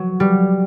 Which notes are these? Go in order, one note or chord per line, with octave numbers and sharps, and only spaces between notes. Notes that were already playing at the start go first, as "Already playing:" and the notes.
Already playing: F#3
G3